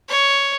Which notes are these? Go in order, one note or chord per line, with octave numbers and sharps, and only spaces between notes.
C#5